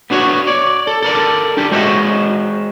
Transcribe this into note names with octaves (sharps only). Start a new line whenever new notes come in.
B3 D4 F#4 C#5
C#5 D5
A4
A4 A#4 D5
D4 G4 A4
G#3 F#4 C5 C#5 D#5 E5